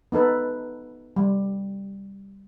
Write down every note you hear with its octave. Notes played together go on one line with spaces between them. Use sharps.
B3 D#4 A4 B4
G3